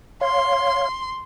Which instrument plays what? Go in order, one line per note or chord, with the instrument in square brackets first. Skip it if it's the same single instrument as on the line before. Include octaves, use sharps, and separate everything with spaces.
[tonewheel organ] C#5 F5 [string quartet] C6